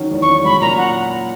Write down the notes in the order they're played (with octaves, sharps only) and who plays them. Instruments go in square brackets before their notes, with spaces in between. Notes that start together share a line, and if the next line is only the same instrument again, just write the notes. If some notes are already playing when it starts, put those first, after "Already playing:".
Already playing: [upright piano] D#3 F#3 C#4
E2
[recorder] C#6
[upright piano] C#4
[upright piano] F#3 [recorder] B5
[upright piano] A#2 [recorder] A#5
[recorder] F#5